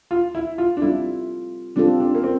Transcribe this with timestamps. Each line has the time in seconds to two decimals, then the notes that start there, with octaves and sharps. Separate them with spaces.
0.11 F4
0.35 E4
0.58 F4
0.77 D4
0.82 G3 C4 E4 F4 A4
1.76 G3 C4 D4 F4 A4
2.00 D4
2.15 A#3
2.24 C4